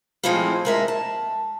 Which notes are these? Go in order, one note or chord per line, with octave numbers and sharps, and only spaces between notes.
F3 G#3 A3 C4 E4 F4
G#3 A#4 E5
A5